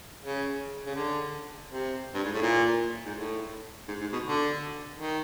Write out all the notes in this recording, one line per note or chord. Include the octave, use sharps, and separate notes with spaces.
C#3
C#3
D3
C3
G2
G#2
A2
A#2
G#2
A2
G#2
G#2
B2
D3
D#3